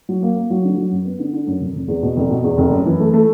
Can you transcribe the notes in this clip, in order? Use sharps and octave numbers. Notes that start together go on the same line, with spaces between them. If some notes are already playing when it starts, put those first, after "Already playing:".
F#3
A#3
A#3
F#3
D3
F#3
F#2
B3
D3
D3
F#2
F1
F1
E2
B2
F1
B2
E2
F1
F#2
E3
A3
A3